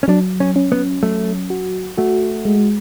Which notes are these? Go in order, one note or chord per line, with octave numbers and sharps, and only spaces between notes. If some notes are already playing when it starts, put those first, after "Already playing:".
C#4
F#3 D4
C#4
C#4
B3
F#3 A3
F#4
A3 F#4
G#3